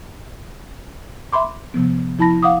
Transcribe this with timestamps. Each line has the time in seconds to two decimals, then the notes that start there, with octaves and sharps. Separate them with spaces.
1.32 E5 B5 C6 D6
1.74 C3 F3 B3
2.19 F3 E4 A5 B5 A#6
2.43 F5 F#5 D6 D#6